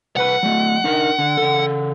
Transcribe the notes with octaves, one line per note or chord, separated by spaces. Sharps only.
C2 B4 F#5 B5
F#3 A3
D4 D#4 A#4
D3
C#3 A4